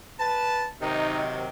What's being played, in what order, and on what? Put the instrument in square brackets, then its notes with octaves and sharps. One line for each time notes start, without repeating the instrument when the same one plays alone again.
[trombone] B4 [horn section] A5
[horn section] C3 D#3 F#3 [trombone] D#4